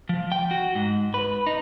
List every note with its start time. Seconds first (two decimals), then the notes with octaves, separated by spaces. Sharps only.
0.09 F3
0.32 G5
0.51 F#4
0.75 G#2
1.14 B4
1.47 D#4